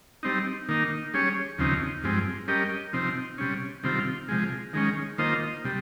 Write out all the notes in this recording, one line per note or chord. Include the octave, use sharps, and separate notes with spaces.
G3 C4 D#4
D#3 A#3 D#4
G3 C#4 G#4 C#5
D#2 C#3 F3 C4 D#4
G2 F3 G#3 C4
G3 C#4 G4 A#4 D#5
C3 F3 C4 D#4
C3 G3 C#4
C3 D#3 G3 C4 F4
C3 F3 G#3
D#3 G#3 C#4
D#3 A#3 F4 C5 D#5
C3 G3